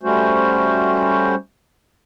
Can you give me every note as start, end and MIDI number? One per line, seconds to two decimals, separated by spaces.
0.03 1.35 55
0.03 1.35 57
0.03 1.35 61
0.03 1.35 66
0.03 1.35 72